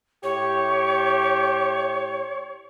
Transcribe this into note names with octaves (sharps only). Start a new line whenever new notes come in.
A2 G4 C#5